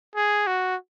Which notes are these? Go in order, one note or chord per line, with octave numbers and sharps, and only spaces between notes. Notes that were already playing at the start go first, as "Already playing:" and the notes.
G#4
F#4